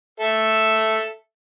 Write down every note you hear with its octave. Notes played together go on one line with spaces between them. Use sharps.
A4 E5